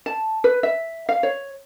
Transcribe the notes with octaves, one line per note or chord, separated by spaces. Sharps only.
A5
B4
E5
F5
C#5